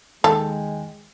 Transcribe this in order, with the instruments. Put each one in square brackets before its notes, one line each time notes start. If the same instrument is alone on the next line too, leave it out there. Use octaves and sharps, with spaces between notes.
[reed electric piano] D#2 D#3 G5 [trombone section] G#3 [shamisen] A4